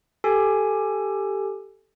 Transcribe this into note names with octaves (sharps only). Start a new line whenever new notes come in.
G4 A4 G#5